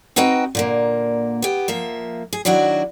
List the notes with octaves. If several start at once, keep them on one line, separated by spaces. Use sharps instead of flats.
C4 D#4 F#4 B4 D#5 G5
A#2 D3 A#3
B3 G4
F3 A#3 E5
G#4
D#3 F#3 D4 E4 F#4